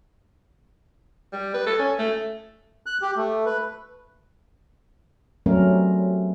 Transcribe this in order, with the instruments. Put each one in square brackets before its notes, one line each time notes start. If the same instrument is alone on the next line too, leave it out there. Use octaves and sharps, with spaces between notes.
[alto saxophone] G3
B4
A4
C#4
A3
[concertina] F#6
G4
A3
B4
[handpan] F#3 G3 A3 C4 C#4 A#4